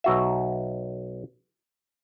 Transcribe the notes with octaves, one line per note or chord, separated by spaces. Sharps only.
B1 F#4 E5